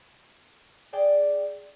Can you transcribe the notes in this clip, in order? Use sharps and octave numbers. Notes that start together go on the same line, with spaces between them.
G#4 D5 G5